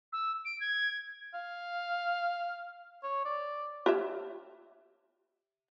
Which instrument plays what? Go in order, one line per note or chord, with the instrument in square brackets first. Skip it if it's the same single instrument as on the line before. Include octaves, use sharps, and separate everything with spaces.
[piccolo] E6
D7
G#6
[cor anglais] F5
C#5
D5
[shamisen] G4 C#5 E5